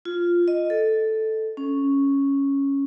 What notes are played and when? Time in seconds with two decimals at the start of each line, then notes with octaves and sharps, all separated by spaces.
0.05 F4
0.48 D#5
0.70 A4
1.57 C#4